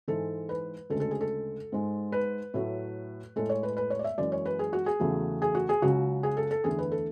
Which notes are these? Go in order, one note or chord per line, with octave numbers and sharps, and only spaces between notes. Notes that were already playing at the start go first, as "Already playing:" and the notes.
G#2 E3 G#3 A4
B4
D2 C#3 G#3 A4
A4
G#4
A4
G#2 G#3
B4
A2 F#3 A3
A2 G#3 A4
C#5
B4
B4
C#5
D5
E5
F#2 E3 G#3 D5
C#5
B4
G#4
F#4
G#4
E2 C#3 F#3 A3
G#4
F#4
G#4
C#2 C#3 F#3 F#4
G#4
A4
A4
E2 D3 A3 G#4
B4
A4